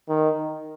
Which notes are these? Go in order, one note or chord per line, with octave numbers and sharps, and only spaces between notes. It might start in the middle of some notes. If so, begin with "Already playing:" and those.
D#3